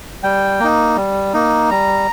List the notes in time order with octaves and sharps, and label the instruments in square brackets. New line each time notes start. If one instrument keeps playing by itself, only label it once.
[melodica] G3 G5
A#3 D#4
G3
A#3 D#4
G3 A#5